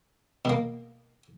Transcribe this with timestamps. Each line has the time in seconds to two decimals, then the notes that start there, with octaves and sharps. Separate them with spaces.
0.45 B2 A#3